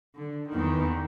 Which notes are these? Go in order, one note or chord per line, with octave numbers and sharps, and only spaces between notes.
D3
E2 D#3